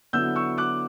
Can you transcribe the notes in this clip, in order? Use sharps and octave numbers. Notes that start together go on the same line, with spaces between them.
D3 F#3 B3 E4 E6 G6
C#6 E6
D6 F#6